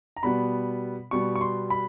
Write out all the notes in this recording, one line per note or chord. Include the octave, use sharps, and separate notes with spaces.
A#5
B2 G3 B3 B5
B2 G3 B3 C#6
C#6
C6
B5